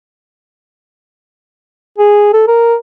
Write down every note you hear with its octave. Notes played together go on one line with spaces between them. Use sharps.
G#4
A4
A#4